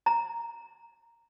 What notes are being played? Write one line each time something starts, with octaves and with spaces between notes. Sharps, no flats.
A#5